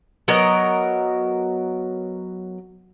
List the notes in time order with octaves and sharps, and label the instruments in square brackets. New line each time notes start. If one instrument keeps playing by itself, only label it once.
[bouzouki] F#3 B3 A#4 D#5